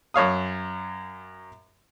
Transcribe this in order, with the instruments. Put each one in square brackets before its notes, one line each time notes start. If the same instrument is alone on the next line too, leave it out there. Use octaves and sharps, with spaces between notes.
[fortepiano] F#2 C#5 F5 D#6